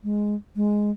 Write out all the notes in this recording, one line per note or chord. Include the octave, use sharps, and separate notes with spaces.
G#3
G#3